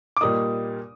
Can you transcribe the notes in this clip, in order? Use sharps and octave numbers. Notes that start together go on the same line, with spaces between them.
D6
A#2 G3 A#3 D#4 D#6